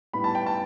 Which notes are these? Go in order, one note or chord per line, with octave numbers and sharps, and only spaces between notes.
A2 G3 B3 B5
A5
G5
A5